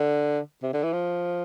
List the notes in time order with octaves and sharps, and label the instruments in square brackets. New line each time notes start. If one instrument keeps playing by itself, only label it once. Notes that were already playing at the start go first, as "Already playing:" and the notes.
Already playing: [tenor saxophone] D3
C3
D3
E3
F3